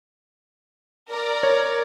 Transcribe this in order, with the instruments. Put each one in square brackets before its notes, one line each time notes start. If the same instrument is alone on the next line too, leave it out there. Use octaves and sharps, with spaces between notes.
[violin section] A#4 D5
[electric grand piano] C#5